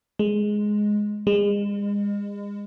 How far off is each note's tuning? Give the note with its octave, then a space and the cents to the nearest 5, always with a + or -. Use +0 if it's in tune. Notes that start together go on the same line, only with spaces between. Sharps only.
G#3 +5
G#3 -35